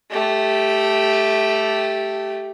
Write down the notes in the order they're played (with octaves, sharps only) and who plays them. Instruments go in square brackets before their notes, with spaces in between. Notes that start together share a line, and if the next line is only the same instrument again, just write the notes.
[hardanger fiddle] A3 G4